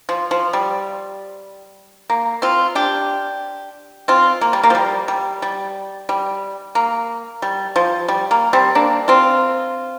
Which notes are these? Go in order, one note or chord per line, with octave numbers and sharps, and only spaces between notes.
F3
F3
G3
A#3
C4 F4
D4 G4
C4 F4
A#3
G3
A#3
F3
G3
G3
G3
G3
A#3
G3
F3
G3
A#3
G3 C4
A#3 D4
C4 F4